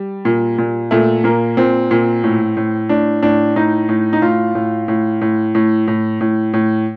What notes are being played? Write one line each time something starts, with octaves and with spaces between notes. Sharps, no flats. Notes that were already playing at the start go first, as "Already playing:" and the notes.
Already playing: G3
A#2
A#2
A#2 A3
A#2 A#3
A#2 C4
A#2
A2
A2
A2 D4
A2 D4
A2 D#4
A2
D#4
A2 F4
A2
A2
A2
A2
A2
A2
A2